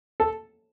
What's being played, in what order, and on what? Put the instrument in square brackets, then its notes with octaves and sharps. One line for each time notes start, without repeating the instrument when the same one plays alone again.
[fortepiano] A4